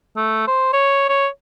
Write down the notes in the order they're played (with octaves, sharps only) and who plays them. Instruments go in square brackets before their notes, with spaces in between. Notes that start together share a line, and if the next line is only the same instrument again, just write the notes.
[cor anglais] A3
C5
C#5
C#5